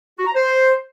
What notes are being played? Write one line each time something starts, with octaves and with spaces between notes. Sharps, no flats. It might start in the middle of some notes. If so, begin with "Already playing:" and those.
F#4
A#5
C5